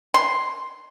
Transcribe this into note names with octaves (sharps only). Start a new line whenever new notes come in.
C6